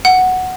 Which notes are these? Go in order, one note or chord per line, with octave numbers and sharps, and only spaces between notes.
F#5